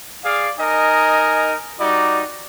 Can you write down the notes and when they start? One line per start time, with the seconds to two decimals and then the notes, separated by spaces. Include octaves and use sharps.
0.24 G#4 D5 F5
0.59 D#4 A#4 D#5 G#5
1.80 G3 D#4 F#4 D5